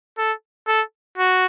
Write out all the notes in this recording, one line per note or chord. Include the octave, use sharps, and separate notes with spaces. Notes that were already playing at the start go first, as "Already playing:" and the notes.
A4
A4
F#4